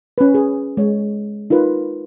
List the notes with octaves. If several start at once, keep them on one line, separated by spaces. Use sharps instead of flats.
C#4 B4
G#4
G#3 C#5
D#4 F4 A#4 B4